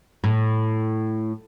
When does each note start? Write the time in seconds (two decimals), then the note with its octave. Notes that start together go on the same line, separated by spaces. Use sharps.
0.24 A2